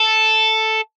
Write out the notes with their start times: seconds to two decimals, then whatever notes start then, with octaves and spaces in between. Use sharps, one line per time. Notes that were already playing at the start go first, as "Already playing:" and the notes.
Already playing: A4